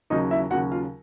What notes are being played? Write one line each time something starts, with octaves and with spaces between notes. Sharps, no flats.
D#2 C#3 F#3 D#4 D#5
E4 E5
D#2 C#3 F#3 F#4 F#5
F4 F5